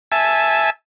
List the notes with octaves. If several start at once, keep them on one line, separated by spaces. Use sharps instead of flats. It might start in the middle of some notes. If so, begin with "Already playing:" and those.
E5 G#5 A5